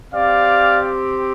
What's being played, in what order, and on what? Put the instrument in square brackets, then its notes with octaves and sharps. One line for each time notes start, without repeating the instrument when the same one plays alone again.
[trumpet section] C4 G4 D5 F5